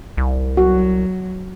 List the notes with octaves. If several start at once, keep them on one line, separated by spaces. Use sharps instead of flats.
C2
F#3 F#4